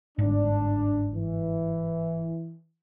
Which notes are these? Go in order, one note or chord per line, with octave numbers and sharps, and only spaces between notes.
G1 G#2 D4
E3